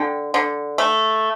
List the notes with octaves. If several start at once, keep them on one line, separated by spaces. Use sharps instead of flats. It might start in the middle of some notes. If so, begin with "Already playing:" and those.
Already playing: D3 G5
D3
A3